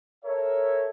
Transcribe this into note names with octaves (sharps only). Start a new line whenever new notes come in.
A4 A#4 C#5 E5